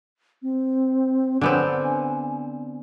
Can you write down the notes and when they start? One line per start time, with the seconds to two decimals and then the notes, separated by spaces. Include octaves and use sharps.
0.42 C4
1.41 D3 B3 C4 G#5